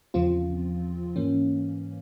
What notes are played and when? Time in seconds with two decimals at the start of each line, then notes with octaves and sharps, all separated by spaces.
0.14 E2 C#3 F3 C4 F4
1.16 G#2 E3 A#3 C#4